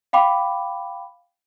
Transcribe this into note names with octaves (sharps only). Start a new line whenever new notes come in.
F5 G5 B5 D6